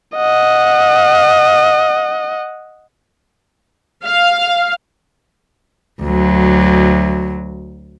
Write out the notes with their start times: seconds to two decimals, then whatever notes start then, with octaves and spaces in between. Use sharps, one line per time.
0.16 D#5 F#5
4.05 F5
6.02 D2 F#3